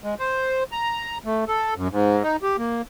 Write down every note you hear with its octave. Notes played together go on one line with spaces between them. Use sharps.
G#3
C5
A#5
A3
A4
F#2
G#2
D#4
G4
A#3